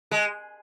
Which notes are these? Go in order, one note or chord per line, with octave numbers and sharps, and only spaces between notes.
G#3